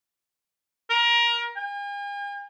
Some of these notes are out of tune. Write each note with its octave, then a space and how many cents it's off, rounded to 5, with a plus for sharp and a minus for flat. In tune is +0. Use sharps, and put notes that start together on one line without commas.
A#4 +20
G#5 -45